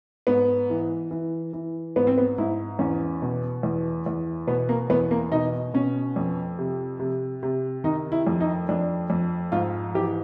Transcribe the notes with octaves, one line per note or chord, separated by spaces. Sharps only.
G#2 B3
E3
E3
E3
G#2 B3
C4
B3
G#2 E4
E2 C#4
B2
E2
E2
B2 B3
A#3
E2 B3
A#3
B2 D#4
B2 C#4
F2
C3
C3
C3
D#3 D#4
E4
F2
D#4
F2 D4
F2
G#2 F4
E3 G4